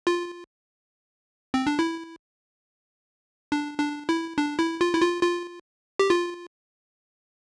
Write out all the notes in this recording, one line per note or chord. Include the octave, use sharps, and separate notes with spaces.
F4
C4
D4
E4
D4
D4
E4
D4
E4
F4
E4
F4
F4
G4
F4